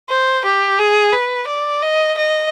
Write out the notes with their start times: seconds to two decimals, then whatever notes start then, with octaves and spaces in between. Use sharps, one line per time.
0.09 C5
0.45 G4
0.79 G#4
1.13 B4
1.48 D5
1.82 D#5
2.17 D#5